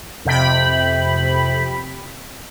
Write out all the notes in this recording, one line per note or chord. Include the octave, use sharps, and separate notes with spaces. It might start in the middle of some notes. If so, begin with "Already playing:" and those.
F2 C3 G5 B5